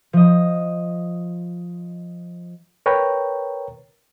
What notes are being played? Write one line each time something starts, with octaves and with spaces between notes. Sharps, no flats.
F3 D#5
A#4 B4 C#5 G5 A#5